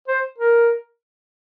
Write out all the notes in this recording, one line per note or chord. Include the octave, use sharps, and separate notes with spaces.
C5
A#4